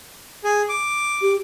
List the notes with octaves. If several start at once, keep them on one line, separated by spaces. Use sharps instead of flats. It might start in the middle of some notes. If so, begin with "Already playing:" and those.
G#4
D6
G4